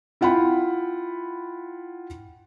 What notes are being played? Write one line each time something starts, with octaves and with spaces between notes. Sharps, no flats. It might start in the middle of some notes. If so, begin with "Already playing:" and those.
E4 F4 F#5 G5 B5